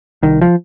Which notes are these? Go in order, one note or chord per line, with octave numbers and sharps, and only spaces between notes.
C2 D#3
F3